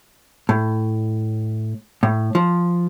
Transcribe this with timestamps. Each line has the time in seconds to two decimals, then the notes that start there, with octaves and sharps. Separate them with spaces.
0.49 A2
2.03 A2
2.35 F3